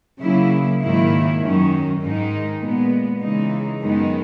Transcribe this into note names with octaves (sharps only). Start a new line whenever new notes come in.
C#3 F#3 A#3 E4
G#2 D#3 F#3 A#3 E4
F#2 D#3 F#3 C#4
G#2 D#3 G#3 D#4
A#2 G#3 B3
C#3 E3 G#3 D#4
F#2 D#3 G#3 B3 D#4